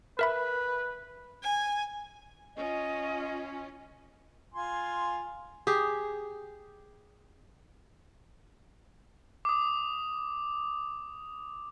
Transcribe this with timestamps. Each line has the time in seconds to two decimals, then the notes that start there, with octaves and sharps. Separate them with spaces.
0.19 A#4 B4 E5 B5
1.43 G#5
2.56 C#4 F4 D#5
4.54 F4 G#5 C6
5.67 G4 G#4
9.45 D6 D#6